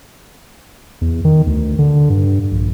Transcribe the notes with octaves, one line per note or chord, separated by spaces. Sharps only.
E2
D#3
D2
D3
G2
A#1